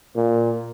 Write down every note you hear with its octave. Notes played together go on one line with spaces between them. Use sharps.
A#2